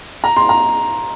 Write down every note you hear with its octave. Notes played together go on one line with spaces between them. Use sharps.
A#5
C6
A#5